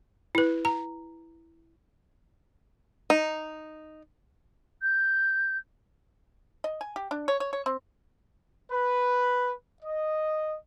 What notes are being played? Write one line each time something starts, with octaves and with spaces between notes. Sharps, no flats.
E4 B4
A#5
D#4
G6
D#5
G#5
G4
D4
C#5
C#5
C#5
C4
B4
D#5